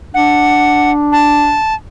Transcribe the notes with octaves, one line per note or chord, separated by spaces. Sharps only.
D4 F#5
A5